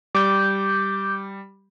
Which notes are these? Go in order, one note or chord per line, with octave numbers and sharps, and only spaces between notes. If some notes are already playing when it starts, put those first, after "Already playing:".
G3 D6 G6